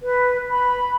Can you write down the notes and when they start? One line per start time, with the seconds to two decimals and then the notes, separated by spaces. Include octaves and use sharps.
0.01 B4
0.50 B5